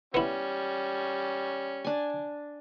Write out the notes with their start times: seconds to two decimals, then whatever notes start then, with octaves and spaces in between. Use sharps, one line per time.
0.14 G3 B3 C#4 E4
1.85 D4 G#5